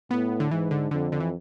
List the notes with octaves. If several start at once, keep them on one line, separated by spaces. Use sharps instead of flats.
A2 B3
D3
G#2 E3
D3
F2 D3
D3
E3